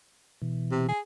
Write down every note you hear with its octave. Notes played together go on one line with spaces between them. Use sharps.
B2 E3
C3
G#4